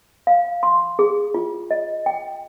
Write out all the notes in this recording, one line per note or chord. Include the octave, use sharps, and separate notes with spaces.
F5
C6
G#4
F4
D#5
G5